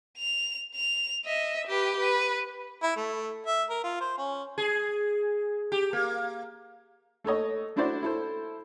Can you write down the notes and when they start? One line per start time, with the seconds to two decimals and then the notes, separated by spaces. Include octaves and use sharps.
0.18 F7
0.75 F7
1.25 D#5 E5
1.67 G4 B4
2.00 B4
2.83 E4
2.96 A3
3.46 E5
3.70 A#4
3.84 F4
4.01 C5
4.18 C#4
4.58 G#4
5.72 G4
5.93 A#3
7.24 A3 A4 C#5 D#5
7.76 A3 D4 E4 F#4 C5 D5
8.02 E4 A4 C5